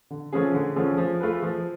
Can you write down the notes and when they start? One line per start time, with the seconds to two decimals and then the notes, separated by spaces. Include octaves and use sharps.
0.10 D3
0.33 F3 A3 C#4 G#4
0.54 D3
0.76 F3 A3 C#4 G#4
0.98 F3
1.20 A3 F4 G#4 B4
1.42 F3